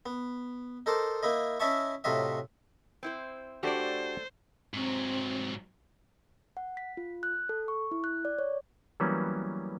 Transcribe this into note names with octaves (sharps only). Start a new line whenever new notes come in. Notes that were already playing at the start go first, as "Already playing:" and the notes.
B3
D#4 A4 A#4 C5 D6
A#3 D#4 E4 D#5
C#4 E4 D#5 E5 A5 C#6
A2 C3 F#3 F4 D#5 E5
C4 E4 C5
A3 D4 F#4 G4 A4 C5 D5
G#2 F#3 C4
F#5
B6
F4
F#6
A4
C#6
E4
F#6
D5
C#5
E3 F#3 G3 A#3 B3 C#4